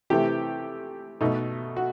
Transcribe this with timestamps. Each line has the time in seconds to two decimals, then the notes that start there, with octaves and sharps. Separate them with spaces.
0.10 C3 E3 A3 G4
1.21 B2 A3 D#4
1.76 F#4